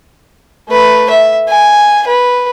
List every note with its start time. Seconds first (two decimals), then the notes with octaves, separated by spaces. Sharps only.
0.69 A3 B4
1.10 E5
1.49 G#5
2.07 B4